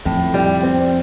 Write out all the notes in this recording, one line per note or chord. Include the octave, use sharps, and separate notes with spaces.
F2 A2
G3
C4